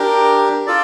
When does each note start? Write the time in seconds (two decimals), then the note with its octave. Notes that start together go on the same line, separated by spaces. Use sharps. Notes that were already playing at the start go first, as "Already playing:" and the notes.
Already playing: D4 G4 A#4
0.66 F4 A4 D5